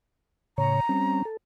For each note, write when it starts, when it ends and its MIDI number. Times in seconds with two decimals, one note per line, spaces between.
0.58 0.80 45
0.58 0.80 49
0.58 0.80 73
0.58 1.21 82
0.89 1.22 55
0.89 1.22 60
0.89 1.22 61
1.25 1.37 69